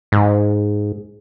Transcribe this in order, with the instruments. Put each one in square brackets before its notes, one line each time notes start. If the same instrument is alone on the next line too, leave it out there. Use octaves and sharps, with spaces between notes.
[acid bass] G#2